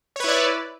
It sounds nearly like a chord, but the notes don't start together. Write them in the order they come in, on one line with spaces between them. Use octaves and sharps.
C#5 B4 E4 D5